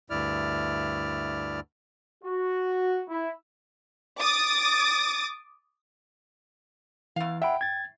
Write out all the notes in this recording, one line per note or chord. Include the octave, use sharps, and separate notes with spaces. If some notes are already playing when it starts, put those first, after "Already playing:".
D2 G2 E4 D5 F6
F#4
E4
D6 D#6 A6
E2 E3 F5
E5 F#5 G5 B5
G#6 A6